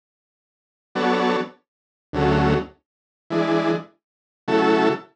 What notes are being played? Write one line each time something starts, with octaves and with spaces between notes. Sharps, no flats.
F#3 B3 D4 A4 C#5
D2 C#3 F#3 A3
E3 G#3 D4
C#3 F#3 A3 E4 A4